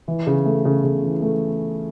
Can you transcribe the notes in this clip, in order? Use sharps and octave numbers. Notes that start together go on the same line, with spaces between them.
E3
C#3
A3
C#3
C#3
E3
A3